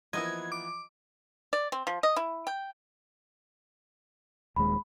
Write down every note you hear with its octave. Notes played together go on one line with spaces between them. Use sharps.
E3 F3 A#3 B3 E4 F4 D#5 G#6
D6
D5
C4
F3
D#5
E4
G5
D#1 D#2 G#3 B5